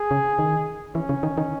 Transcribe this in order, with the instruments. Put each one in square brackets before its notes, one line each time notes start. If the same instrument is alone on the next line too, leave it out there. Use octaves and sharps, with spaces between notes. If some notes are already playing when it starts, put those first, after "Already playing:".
Already playing: [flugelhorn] G#4
[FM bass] C#3
D#3
[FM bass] E3 [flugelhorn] C#4
[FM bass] C#3
D#3
D#3